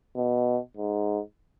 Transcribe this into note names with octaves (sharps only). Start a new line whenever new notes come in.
B2
G#2